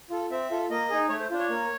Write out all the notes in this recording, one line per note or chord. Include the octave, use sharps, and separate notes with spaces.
F4 A4
C4 E5
F4 A4
A#3 D#5
D#4 G#4
A3 C#5
C5
D4 F4
C#5
A#3